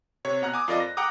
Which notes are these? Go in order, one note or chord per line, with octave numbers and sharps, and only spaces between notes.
C3 C#5
B2 F#5 A#5 F#6
G#5 D6 D#6
F2 F4 A#4 D5 D#5 D6
A#6
F#5 G5 A#5 D6 D#6